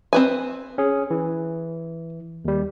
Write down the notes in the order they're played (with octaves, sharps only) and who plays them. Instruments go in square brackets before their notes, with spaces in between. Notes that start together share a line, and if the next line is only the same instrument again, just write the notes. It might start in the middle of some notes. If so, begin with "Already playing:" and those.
[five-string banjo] C4 B4 G#5
[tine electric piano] C#4 G#4
E3
D#2 G3